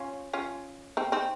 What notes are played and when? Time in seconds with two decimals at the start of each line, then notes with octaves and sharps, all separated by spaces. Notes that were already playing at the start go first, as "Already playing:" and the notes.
Already playing: C#4 F4
0.33 C#4 F4
0.97 C4 D#4
1.12 C4 D#4